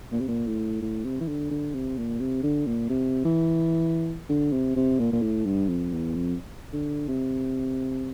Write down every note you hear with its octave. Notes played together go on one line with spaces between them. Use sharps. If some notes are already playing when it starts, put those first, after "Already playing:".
A#2
C3
A#2
A2
A2
C3
E3
D3
D3
C3
A#2
C3
D3
A#2
C3
E3
D3
C3
C3
A#2
A#2
A2
G2
F2
E2
F2
D3
C3